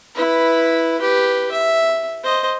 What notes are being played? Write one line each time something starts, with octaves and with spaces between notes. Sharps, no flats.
E4 B4
G4 B4
E5
C5 D#5